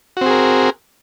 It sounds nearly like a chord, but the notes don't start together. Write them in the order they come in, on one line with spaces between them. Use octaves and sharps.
F#4 C4 G#4 A#4